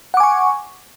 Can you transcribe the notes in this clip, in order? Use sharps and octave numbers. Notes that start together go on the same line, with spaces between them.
F#5 G#5 C#6 D6